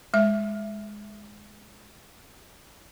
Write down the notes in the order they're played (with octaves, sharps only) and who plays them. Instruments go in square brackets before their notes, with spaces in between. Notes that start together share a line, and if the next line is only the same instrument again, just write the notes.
[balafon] G#3 E5